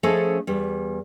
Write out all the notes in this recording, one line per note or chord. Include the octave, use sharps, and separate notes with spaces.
F3 A3 C#4 G#4 A4 D#5
E2 G3